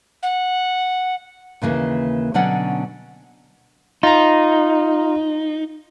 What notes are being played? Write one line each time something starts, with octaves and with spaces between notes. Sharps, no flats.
F#5
D#2 C#3 E3 A#3
B2 D3 F#3 C#4 D5 F#5
D#4 F4 A#5